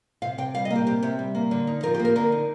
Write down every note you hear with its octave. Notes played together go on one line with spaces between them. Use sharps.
C3 F5
C3 G5
G3 F5
D#5
A#3
G4
C3 G4
C3 G4
G3
A#3
D3
D#4
F3 A#4
G4
A#3
A#4
D3 A#4
D#4